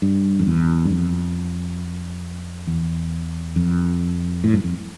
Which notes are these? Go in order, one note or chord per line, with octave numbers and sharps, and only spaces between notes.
G2
F2
E2
G2
F2
E2
F2
A2
G2
F2